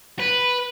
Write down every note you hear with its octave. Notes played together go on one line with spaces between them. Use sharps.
B4